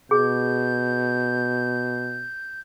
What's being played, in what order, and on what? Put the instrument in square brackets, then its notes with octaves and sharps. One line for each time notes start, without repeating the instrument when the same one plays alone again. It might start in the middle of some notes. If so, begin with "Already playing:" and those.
[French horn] B2 [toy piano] G#4 [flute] G6